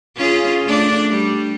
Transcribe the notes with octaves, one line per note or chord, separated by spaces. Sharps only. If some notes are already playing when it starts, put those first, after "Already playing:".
C#4 F4 G#4
A3 D4 D5
G3